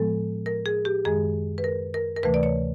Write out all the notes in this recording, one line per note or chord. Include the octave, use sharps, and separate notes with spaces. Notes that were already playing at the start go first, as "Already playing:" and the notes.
Already playing: A2 F3 G#3 B3 A4
A#4
G#4
G4
F#2 D#3 G#3 G#4
B4
A#4
A#4
A#4
D2 C3 E3 A3 B4
D5
C#5